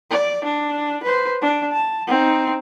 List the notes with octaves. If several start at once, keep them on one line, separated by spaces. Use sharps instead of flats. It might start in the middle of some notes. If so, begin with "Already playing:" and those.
D5
D4
B4 C5
D4
A5
C4 D#4